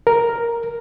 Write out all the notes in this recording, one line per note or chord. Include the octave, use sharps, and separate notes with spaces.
A#4